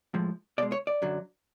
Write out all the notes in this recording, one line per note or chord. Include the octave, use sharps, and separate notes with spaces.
A2 F3 G#3
B2 G#3 D5
C#5
D5
F#2 D3 F#3